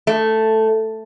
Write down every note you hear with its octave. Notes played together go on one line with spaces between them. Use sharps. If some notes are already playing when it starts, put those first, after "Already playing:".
A3